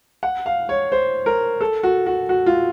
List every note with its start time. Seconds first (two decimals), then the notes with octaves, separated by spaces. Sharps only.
0.23 F#5
0.46 F5
0.69 C#5
0.92 C5
1.26 A#4
1.61 A4
1.83 F#4
2.06 F#4
2.29 F#4
2.46 F4